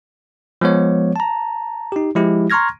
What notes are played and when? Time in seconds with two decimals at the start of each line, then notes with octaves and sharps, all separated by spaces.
0.61 F3 G#3 B3 C#5
1.16 A5 A#5
1.92 D#4 G4
2.15 F3 G#3 E4 G4
2.50 A#5 C6 C#6 F6 G#6 A#6